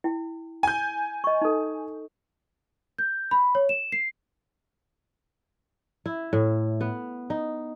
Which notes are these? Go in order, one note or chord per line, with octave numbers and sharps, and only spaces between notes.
E4 G5
G#5 G6
D#5 C#6
D#4 A4
G6
B5
C#5
E7
C7
E4
A2
B3
D#4